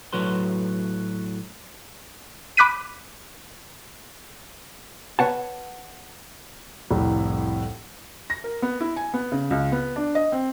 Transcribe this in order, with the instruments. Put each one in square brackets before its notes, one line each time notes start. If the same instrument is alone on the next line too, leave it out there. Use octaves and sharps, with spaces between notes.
[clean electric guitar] A2 F#3 F#4 B4 C6
[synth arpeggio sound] B5 D6 F#6 B6 D#7
[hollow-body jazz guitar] B4 C#5 F#5 A5
[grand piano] C2 F2 A2
[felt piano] A#6
A#4
B3
E4
G#5
B3
C#3
C#2
B3
D4
D#5
C4